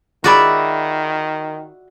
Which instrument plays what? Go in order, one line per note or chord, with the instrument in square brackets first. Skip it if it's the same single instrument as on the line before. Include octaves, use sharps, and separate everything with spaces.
[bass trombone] D#3 [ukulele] F4 G#4 B5 [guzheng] F#4 D5 E5